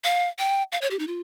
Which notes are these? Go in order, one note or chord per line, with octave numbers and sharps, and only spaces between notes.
F5
G5
F5
C#5
G4
D#4
F4